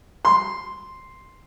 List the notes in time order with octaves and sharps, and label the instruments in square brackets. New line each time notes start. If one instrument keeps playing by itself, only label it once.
[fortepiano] C6